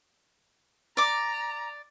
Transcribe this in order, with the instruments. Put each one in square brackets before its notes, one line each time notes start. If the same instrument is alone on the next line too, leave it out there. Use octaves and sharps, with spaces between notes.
[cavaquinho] D5 D6 [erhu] A#5